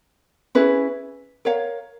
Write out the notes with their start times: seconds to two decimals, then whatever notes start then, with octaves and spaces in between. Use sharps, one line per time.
0.55 C#4 E4 G#4 B4
1.45 A#4 C#5 F5